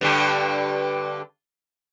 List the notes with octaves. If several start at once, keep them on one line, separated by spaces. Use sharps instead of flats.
G2 D3 G4